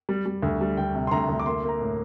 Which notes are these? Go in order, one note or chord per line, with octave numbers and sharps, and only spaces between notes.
G3
G3
D2
G3
D2 G5
C3
C6
D2 A#5
D2
D6
A#3 C6
A#3 A#5
A2